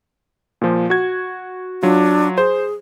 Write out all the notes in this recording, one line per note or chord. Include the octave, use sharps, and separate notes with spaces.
A#2 F3
F#4 G#6
F#3 D4 F4
G#4 C5